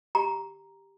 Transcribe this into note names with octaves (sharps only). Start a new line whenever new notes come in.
G4 A#5